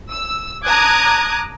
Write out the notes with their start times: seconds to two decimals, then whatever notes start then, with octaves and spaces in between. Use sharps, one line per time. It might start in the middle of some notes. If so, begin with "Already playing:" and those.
0.12 E6
0.67 A5 A#5 D6 D#6 F#6 G#6